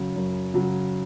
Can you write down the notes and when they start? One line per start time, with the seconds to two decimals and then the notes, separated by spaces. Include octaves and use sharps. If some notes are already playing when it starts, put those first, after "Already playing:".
Already playing: F#2 C#3 F#3
0.16 F#2
0.54 C#3 F#3